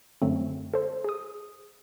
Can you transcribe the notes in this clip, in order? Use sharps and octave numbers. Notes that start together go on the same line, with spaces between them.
F#2 D3 F#3 A3 C4
A4 C5
G#4 D#6